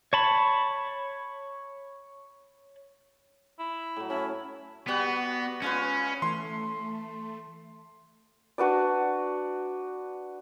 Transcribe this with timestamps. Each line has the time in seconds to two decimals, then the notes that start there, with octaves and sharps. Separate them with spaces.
0.13 C#5 A5 B5
3.59 E4
3.96 A2 F#3
4.10 A3 C#4 E4 C#5
4.88 G3 B3 F#4
5.62 G#3 C#4 F4 B4
6.22 E3 A3 C6
8.58 D4 F#4 B4 D5